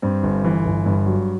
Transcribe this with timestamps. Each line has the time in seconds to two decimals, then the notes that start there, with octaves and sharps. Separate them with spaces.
0.02 G2 C4
0.23 G1
0.44 E3
0.65 G1
0.86 G2
1.06 F#3